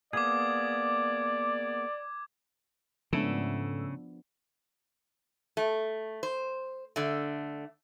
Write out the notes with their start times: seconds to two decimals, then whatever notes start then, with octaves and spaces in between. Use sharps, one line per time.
0.13 A#3 B3 G#4 D5 D6 G#6
3.13 G#2 C#3 F3 A3 B3 D4 E6
5.57 A3
6.23 C5
6.96 D3 A3